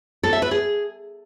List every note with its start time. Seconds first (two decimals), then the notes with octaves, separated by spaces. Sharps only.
0.23 A4
0.33 E5
0.42 B4
0.51 G#4